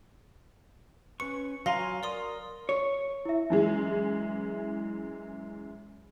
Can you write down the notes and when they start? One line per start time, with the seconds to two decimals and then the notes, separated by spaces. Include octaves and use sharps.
1.20 C#4 B4 C#6 C#7
1.66 F#3 F5 G#5 A#5 C6 C#6 A#6
2.03 A#4 D5 C6 D#6
2.69 C#5
3.25 E4 E5
3.50 F#2 E3 G#3